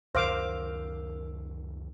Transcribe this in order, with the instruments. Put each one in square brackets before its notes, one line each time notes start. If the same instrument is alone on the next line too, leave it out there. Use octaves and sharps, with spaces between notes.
[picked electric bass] C#2 F#2 D#3 [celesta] A#4 E6 [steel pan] C5 F5 D6